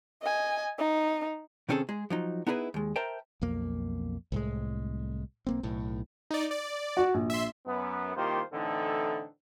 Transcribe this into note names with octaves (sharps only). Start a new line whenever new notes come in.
D#5 G#5
D#4
C3 D#3 C4 C#4 G#4 A4
G#3 G#4
F3 F#3 D#4
B3 D#4 E4 G#4 A#4 B4
D#2 G#3
A#4 C5 E5 G5 A5 A#5
B1 F2 A#3
C2 A2 G#3
B1 A#3 C4
B1 A2
D#4 D5
D5
F#4
A#1
E5 C6
F#2 B3
C2 D#3 A#3 F4 G4 C5
A2 D3 E3 C4 D#4 A4